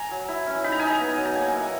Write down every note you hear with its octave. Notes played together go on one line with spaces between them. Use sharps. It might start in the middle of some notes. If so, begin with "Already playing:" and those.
Already playing: G#5 A#5
F#3
E4
C#4
D#4 B5
A#5
D#4 G#5
A#5
B3
F#3
A#5
A#3 G#5
F#5
E4 G#5
F#5